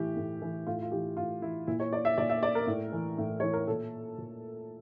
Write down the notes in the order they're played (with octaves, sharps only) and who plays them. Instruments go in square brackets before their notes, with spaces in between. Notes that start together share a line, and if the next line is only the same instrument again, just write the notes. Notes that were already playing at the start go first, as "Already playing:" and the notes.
Already playing: [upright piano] A2 E3 G4
A2
E3
A2 F4
F4
E3 G4
A2 F4
E3 E4
A#2 E4
C#5
D5
E5
A#2 D5
E5
D5
A#4
A2
E3
A2
E3 C#5
A#4
A#2 A4
A#2